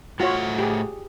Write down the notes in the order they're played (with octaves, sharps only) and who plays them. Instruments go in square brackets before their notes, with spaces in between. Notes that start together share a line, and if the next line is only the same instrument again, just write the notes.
[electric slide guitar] A2 A3 F#5 [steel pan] F4 F#4 C#5
[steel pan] G4 G#4